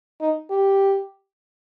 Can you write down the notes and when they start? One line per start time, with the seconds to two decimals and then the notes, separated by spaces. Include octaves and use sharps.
0.21 D#4
0.50 G4